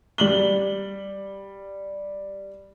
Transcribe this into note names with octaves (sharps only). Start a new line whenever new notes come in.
G3 F#7 G7